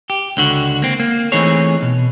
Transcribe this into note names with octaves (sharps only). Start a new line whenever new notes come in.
G4
C#2 D3 F#4
A#3 C4
A#3
E3 A3 C4 D#4 G#4 C#5
B2